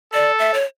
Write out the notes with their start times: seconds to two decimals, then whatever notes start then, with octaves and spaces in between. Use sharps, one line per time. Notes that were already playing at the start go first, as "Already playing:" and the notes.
0.13 A4 D5
0.39 E5
0.54 C#5